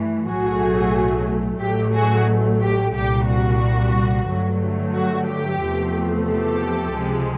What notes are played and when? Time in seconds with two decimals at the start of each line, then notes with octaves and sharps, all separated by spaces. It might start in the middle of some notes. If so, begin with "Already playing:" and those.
Already playing: G2 E3 A3
0.27 B1 A2 F#3 A3 F#4 G#4
1.60 A1 A2 F#3 A3 G4
1.94 F#4 G#4
2.62 G4
2.94 C2 A#2 G3 G4
3.27 F#4
4.28 G2 D3 F#3 A3
4.94 F#4
5.28 G4
5.62 E2 C3 F3 A3
6.28 G4 A4
6.94 C#2 C3 F3 G#3